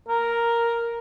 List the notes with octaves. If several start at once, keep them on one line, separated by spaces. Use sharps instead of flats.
A#4